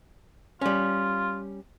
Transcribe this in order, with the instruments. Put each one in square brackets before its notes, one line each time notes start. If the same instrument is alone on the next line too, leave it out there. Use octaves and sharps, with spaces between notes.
[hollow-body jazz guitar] G3 C#4 [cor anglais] F4